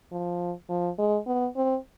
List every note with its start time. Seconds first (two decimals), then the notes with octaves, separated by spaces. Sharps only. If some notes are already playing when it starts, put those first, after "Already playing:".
0.12 F3
0.69 F3
0.99 G#3
1.27 B3
1.56 C4